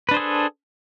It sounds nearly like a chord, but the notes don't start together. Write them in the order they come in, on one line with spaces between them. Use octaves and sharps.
B4 D4 C5 G#4 A4